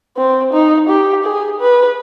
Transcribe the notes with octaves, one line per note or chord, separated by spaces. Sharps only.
C4
D#4
G4
G#4
B4